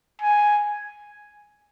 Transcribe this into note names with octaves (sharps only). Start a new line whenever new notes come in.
G#5